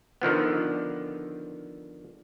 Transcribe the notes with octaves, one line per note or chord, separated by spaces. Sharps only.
D3 D#3 F3 B3